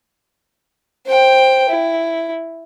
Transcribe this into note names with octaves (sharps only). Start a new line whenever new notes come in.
C5 G5
E4